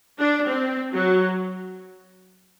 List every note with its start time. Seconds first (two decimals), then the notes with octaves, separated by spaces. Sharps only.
0.19 D4
0.48 C4
0.93 F#3